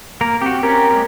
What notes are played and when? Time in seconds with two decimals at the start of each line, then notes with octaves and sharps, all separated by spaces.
0.21 A#3 A#4
0.42 C4 F#4 G4
0.63 C4 C#4 G4 A#4
0.91 G#3 A#3 G4